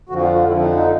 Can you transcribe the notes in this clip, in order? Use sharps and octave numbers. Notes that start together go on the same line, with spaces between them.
F2 D3 F3 F#4
F4
F4
F2 D3 F3 E4
D#4
D#4